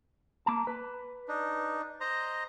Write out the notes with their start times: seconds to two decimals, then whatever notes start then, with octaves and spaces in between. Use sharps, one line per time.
0.46 A#3 A5
0.67 B4
1.28 D4 D#4
2.00 C5 D#5 A#5